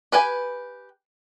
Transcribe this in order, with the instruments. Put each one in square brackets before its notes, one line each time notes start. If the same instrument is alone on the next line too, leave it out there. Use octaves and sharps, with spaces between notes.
[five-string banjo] G4 B4 G5 G#5